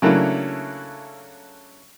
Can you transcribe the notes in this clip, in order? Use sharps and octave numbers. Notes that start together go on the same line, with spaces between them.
C#3 F#3 A3 A#3 D4 E4